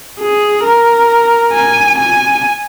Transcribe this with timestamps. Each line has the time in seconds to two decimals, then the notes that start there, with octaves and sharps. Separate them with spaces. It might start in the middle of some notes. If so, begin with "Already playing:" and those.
0.19 G#4
0.64 A#4
1.53 G#5
1.98 G#5